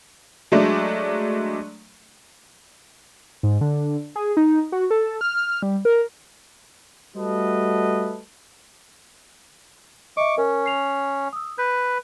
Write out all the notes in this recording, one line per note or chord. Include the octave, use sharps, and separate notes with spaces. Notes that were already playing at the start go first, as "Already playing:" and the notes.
F#3 G#3 A3 D4 D5
G#2
D3
G#4
D#4
F#4
A4
F6
G3
A#4
G3 A3 F#4 A4 B4 D#5
D#5 E5 C#6 D6
C#4 A#4
C7 F7
D#6 E6
B4 G6